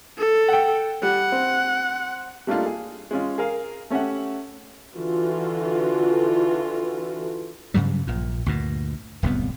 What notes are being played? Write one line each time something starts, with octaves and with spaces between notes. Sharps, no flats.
A4
F#5 G5
G3 F#5
C4
G3 A3 A#3 D4 D#4 F4
G#4
G#3 C#4 F4
G#4 A#4 F5
A3 C#4 G4 E5 F#5
D3 E3 F4 F#4
G2 C#3 F#3 G3
A#1 A#2
D2 G2 A#2
D1 C2 F2 B3